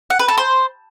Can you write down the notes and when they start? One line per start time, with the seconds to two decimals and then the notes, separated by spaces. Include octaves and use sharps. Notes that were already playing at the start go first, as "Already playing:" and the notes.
0.10 F#5
0.19 B4
0.28 A4
0.38 C5